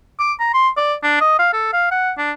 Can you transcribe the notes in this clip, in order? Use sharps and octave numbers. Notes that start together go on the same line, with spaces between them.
D6
A#5
C6
D5
D4
D#5
F5
A4
F5
F#5
D4